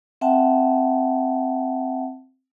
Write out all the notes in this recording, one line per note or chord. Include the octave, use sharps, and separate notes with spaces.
C4 E5 F#5 G5 A5